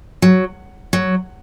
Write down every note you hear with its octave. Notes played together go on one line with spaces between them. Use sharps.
F#3
F#3